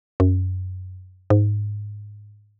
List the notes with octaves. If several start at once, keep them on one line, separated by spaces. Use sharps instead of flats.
F#2
G#2